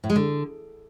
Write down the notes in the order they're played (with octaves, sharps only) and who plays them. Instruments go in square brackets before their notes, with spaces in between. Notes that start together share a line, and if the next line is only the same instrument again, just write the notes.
[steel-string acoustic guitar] A2
G#3
D3